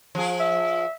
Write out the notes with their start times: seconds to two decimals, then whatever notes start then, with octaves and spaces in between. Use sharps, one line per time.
0.15 F3 G#4
0.40 E5